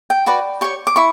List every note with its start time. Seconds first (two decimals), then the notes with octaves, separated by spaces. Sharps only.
0.10 G5
0.26 F#4 B4 D5
0.61 G4 C#5 C#6
0.87 D6
0.96 E4 C#6